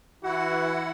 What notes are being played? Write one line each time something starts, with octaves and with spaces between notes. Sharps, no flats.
E3 E4 F#4 F#5